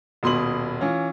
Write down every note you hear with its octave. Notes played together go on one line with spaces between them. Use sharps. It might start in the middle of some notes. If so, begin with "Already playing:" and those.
D#1 B2 C6 D#6 F#7
E3 C#4 F4